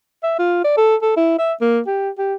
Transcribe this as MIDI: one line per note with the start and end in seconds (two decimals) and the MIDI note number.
0.23 0.37 76
0.39 0.62 65
0.64 0.73 74
0.77 0.96 69
1.02 1.16 69
1.17 1.38 64
1.39 1.53 76
1.61 1.80 58
1.87 2.10 67
2.18 2.35 67